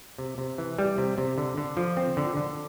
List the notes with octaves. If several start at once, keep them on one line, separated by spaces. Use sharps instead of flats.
C3
C3
E3
G3
C3
C3
D3
D3
F3
C4
D3
D3